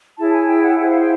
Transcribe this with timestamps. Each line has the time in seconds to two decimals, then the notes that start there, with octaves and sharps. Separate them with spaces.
0.18 E4 G#4 C#5 A5
0.33 G#5
0.49 G5
0.63 F#5
0.79 E4 G#4 C5 F#5
0.90 F5
1.00 G5